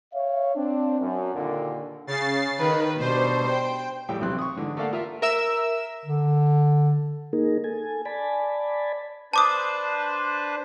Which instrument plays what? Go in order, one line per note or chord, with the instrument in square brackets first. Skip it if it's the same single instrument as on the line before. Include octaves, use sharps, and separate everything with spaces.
[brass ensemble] C#5 E5 F5
C4 D4
F#2
D#2 A#2 D3
[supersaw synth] C#3 A6 C7
[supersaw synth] D#3 [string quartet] B4
[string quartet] B2 G3 D4 [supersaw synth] C5
[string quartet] G5
[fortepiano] A#1 A2 G3 G5
B1 C3 E3 C4 C6 F#6
C#6 D#6
G#2 D3 E3
A3 A#3 A4 D5 F5 F#5
F4 A#4 E5
[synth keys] A#4 E5 E6
[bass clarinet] D3
[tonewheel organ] A#3 D#4 G#4 A#4
A4 G#5
D5 G#5 A5 B5
[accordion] D4 B4 C5 [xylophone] A5 D6 D#6